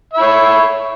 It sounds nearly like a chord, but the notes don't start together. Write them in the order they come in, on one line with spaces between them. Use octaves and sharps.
E5 B5 C#5